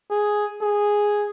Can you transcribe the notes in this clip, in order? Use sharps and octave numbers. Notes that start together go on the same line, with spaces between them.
G#4
G#4